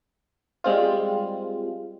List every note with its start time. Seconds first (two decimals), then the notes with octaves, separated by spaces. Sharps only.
0.64 G3 G#3 C4 F4